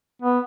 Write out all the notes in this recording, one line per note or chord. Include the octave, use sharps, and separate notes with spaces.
B3